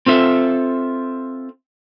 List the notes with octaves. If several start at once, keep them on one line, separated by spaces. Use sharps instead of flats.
C4 F4 A4 E5